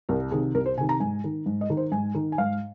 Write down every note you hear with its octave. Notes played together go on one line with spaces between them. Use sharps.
C2 A#4
C3 D#3 G#4
C2 A#4
C5
C3 D#3 G#5
A#5
G#2 G#5
D#3
G#2
D#5
D#3
C5
G#2 G#5
D#3
G#5
G#2 F5